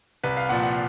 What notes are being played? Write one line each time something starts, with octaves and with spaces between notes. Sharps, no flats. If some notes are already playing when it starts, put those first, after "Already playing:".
C2 B4
F5
A#2 F3 F#5
F#5